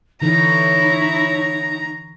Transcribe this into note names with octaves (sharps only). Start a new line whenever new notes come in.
D3 E3 D#4 E4 C#5 A#5